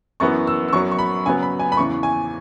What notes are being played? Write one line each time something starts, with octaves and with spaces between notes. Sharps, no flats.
F#2 E3 B3 C#6
E6
E6
F#2 F#3 B3 C#6
C#6
B5
C#3 F#3 B3 G#5
B5
G#5
B5
E2 C#3 E3 C#6
G#5